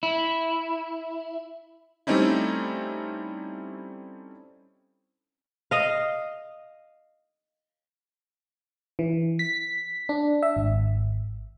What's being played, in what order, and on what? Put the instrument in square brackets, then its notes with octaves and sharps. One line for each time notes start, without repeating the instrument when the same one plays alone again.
[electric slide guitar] E4
[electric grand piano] G3 A3 C4 C#4 D#4 E4
[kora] D#5 F5
[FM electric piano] E3
B6
D4
E5
G#1